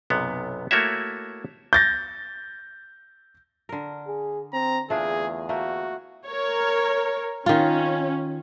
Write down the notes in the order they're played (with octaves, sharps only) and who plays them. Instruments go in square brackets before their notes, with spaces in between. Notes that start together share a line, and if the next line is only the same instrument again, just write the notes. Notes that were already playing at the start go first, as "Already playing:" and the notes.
[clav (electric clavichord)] B1 F#2 C3 B3
A3 A#3 E4 F#4 C#5 E5
[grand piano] G6 A6 A#6
[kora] D3 A#4
[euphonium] G#4
[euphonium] C4 [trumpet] A#5
[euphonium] E2 [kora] A3 D4 F4 [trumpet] G#4
[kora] A3 A#3 [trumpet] F#4
[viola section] A#4 C#5
[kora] D#3 F4 [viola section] C#4